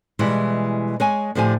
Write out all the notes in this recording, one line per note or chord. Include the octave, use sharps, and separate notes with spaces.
B2 E3 G3 G#3 E4
G#3 C#5 G#5
A2 D3 F3 G4 G#5